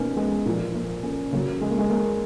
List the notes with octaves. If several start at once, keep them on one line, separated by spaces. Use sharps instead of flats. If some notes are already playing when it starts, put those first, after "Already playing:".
Already playing: B2 A#3 B3 C#4 D#4
G#3 B3
A#2 F3 A#3
A#3
A#3 C#4
C#3 F#3 A#3
G#3
A#3
G#3
A#3